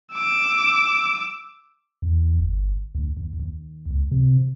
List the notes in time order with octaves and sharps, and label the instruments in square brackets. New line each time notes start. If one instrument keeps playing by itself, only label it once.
[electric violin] D6 E6
[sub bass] E2
G1
D2
D#2
D#2
C#2
C3